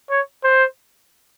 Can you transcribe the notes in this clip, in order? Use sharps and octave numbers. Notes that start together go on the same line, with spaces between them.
C#5
C5